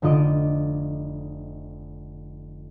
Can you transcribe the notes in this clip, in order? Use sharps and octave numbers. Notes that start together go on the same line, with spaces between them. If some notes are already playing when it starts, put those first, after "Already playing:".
F1 D3 F4 D#5 D6 D#6